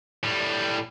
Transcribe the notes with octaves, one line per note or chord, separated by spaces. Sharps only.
A2 G3